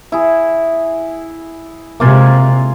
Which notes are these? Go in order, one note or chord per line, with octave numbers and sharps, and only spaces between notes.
E4 G#4
C3 G#3 A#3 F4 G#5